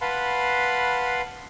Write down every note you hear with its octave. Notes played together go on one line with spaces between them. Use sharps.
B4 F5 F#5 A5 B5 C6